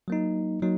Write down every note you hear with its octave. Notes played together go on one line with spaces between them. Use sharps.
F#3 A#3 D#4
F#3 A#3 D#4